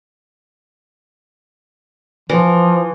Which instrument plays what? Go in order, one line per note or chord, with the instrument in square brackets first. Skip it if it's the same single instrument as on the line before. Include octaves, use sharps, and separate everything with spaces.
[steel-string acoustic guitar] E3 [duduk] F3